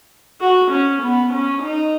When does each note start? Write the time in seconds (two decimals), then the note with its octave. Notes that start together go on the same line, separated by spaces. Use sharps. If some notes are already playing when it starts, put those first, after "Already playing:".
0.41 F#4
0.71 C#4
1.02 B3
1.33 C#4
1.62 D#4